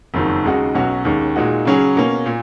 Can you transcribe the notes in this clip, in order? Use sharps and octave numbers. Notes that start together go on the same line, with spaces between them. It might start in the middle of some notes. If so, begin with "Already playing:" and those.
F#1 F2 D#3 F#3
D#2 C#3 G#3 D#4 F#4
B1 B2 F#3 C#4 F#4
D#2 D#3 G#3 C#4
A#2 G#3 D#4 F#4
C#3 F#3 C#4 G#4
B2 A#3 C#4
A#2